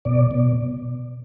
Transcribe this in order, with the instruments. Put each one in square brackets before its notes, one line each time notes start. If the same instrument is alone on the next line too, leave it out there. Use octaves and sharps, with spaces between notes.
[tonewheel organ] B2 D5
B2